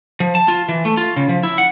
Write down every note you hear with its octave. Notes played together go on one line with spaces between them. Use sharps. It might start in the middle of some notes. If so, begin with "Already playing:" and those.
F3
A5
F4
E3
A3
F4
C#3
F3
E4
F#5